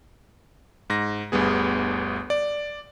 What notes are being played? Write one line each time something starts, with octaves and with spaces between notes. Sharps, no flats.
G#2 A#6
G1 D2 G3 B3 G#4
D5